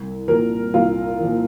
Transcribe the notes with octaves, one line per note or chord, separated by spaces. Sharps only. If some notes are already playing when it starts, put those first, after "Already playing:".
Already playing: C2
A#2 F3 A#4
C2 F4
A#2 F3